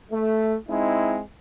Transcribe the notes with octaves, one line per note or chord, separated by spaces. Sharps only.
A3
G#3 C4 D#4 E4